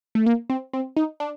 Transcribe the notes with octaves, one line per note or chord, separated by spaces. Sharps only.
A3
A#3
C4
C4
D#4
D4